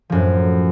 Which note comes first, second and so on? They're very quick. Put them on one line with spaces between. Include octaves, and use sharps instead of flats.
F3 F#2 A2